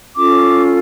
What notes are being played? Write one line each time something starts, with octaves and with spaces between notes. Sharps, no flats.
C#4 F4 A4 D6